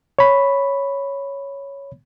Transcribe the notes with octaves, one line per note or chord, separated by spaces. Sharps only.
C#5 B5